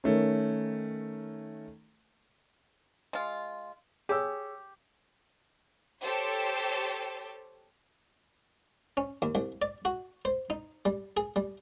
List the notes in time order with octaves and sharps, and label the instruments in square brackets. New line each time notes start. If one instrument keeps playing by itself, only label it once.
[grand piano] D#3 A3 C#4
[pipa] G#3 F4
[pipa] G4 [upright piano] G#4 C#5 E6
[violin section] G4 A4 C5 C#5
[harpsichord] C#4
D#2
C2
D5
F#4
C5
D#4
G3
G#4
G3